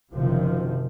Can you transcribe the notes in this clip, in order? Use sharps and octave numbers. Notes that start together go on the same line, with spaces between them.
F#1 C3 D#3 F3